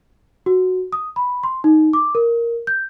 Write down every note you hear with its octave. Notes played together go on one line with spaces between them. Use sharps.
F#4
D#6
B5
C6
D#4
D6
A#4
G6